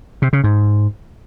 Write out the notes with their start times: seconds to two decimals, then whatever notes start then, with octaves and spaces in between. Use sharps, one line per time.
0.22 C3
0.33 C#3
0.44 G#2